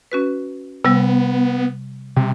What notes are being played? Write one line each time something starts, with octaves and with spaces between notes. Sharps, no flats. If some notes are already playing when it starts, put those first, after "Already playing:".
C#4 F#4 B4
C3 G3 B3
C3 G3